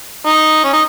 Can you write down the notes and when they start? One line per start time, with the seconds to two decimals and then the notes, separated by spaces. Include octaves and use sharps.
0.26 D#4
0.64 C#4
0.73 D#4